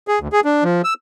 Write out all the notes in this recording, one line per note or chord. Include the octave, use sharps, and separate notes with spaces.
G#4
D2
G#4
D4
F3
E6